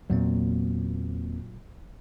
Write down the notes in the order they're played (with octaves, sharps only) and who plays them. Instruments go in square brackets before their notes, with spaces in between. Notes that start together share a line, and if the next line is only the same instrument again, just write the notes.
[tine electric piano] E2 A#3 C4 [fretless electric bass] A#2 F#3